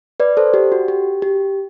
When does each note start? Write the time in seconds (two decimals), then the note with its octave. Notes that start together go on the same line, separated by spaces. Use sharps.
0.20 B4 D5
0.37 A4 C5
0.54 G4
0.72 F#4
0.88 G4
1.22 G4